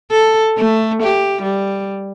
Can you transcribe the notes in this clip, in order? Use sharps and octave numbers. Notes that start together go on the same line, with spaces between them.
A4
A3
G4
G3